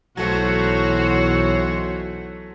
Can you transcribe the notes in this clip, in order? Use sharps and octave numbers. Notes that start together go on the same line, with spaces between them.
B1 E3 F#3 A3 F#4 C5 C#5